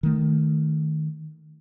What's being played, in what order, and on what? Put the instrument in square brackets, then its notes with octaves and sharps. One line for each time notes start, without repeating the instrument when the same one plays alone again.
[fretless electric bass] D#3 A3